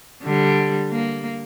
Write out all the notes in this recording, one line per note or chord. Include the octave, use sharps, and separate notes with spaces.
D3 G3
A#3